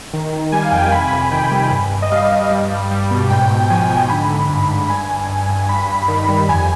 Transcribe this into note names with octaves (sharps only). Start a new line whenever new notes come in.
D#3
D#3
G3 G#5
F5
F2 G5
G#5
C3 B5
G#5
B5
F2
D#3 G5
G3
G2
G2
D#5
G3 F5
G2
G3
G3
G3
B2
G#2 G5
G#2
F3 G#5
G#2
D3 B5
D3
G2
G2
G2 G#5
G2
G2
G2
G2 B5
G2
D#3
G3
F2 G#5